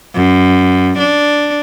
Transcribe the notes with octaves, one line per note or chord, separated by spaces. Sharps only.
F#2
D4